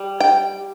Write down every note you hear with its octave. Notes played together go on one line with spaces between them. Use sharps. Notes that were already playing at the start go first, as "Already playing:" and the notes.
Already playing: G3
G5